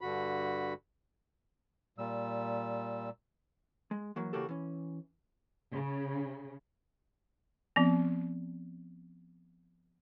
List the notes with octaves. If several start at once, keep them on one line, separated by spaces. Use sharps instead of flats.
G2 D3 F#4 B5
A#2 G3 E6
G#3
E3 F#3 A#3
C#3 E3 A#3 F#4 G4 A4
E3 C#4
C#3
F3 B3 C4